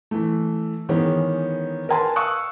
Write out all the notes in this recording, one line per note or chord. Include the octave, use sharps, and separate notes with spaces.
E3 A3
D#3 E3 G#3 B3 C#4
A#4 B4 G#5 A5 C6
F5 C#6 D#6 E6 F#6